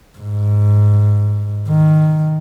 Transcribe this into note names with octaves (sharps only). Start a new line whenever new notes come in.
G#2
D#3